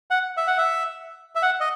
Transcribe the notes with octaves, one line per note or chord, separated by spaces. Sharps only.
F#5
E5
F#5
E5
E5
F#5
D#5